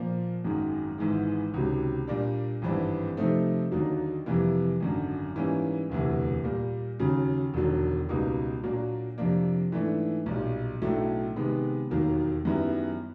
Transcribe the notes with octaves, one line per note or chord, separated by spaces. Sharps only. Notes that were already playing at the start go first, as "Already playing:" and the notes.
Already playing: A#2 F3 A#3
G#1 F#2 D#3 G#3
G#1 G#2 E3 G#3
C#2 C3 D#3 F#3
A#2 G3 A#3 D4
G#1 G2 E3 G3 C4
C3 F3 A3 C4 D#4
D#2 D3 F#3 A#3 D#4
F2 C3 E3 G3 A#3
G#1 F#2 D3
G#2 E3 G3 A#3 C#4
E1 D2 C3 E3
A#2 G3 A#3
D#2 C#3 F#3
E1 D#2 D3 F#3
C#2 B2 G3 A#3 D#4
A#2 F#3 A#3 D4 F#4
F2 C3 F3 A#3 D4
G#2 E3 A3 D4
B1 A#2 G3
B1 A2 F#3 A3 D4
C3 D#3 G#3 B3
E1 D#2 D#3 F#3 A#3
F#2 D#3 G3 B3 E4